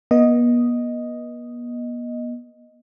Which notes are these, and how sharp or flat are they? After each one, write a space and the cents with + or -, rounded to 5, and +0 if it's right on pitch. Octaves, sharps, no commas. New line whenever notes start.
B3 -40 D#5 +0